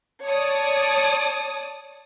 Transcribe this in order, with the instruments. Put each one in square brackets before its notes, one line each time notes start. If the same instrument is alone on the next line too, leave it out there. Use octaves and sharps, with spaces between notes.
[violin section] C#5 D5 A5 D#6